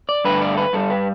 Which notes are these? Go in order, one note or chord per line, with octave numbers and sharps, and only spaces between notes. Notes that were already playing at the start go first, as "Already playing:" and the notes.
D5
G2 D3 A3 B4
D5
A4
B4
G2 G3 A4
B4